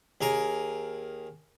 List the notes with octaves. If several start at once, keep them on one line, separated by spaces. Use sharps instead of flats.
D#2 G#4 A#4